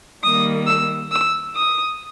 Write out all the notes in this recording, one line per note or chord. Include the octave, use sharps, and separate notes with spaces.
D#3 G3 A#3 D#6
E6
E6
D#6